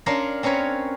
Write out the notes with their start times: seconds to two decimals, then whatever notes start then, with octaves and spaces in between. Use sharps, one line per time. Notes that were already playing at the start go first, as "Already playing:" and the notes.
0.06 C#4 D4 A#4 F5 A#5 C6
0.43 C4 C#4 A#4 B4 C#5